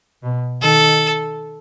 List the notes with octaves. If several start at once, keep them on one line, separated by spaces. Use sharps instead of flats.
B2
D#3 A4